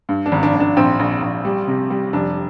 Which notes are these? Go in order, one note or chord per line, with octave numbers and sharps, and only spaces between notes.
G2
D4
G#1
D4
G#1
D4
A#1 C4
A#1
A#1
G3
C3
G3
F1 D4